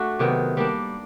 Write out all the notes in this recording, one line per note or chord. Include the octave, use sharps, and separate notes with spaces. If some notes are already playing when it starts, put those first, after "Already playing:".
Already playing: A3 D4 F#4
C3 D#3 F#3 B3
G3 A#3 D4